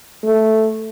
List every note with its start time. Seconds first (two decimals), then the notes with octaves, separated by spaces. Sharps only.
0.24 A3